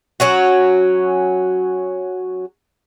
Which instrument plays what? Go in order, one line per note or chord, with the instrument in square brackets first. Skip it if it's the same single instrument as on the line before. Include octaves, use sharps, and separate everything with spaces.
[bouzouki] F#3 C#4 F#4